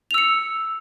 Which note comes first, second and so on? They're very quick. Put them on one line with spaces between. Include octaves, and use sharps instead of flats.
F7 E6 C#7